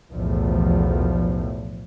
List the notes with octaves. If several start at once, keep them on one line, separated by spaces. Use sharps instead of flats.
B1 E2 A2 F3